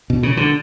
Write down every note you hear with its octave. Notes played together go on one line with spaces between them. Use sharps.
B2
C#3
D3